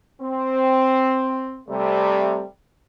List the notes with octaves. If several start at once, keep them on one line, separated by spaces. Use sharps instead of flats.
C4
C3 G3 A3